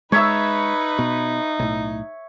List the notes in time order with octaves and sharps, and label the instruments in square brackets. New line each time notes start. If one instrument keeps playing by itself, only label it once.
[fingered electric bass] G#3 [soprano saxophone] D#4 [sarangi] B4 [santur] C#5 E5 E6
[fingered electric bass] B2
B1 A2